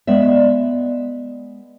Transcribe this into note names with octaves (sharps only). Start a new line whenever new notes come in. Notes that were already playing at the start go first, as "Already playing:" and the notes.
G#3 B3 D5 E5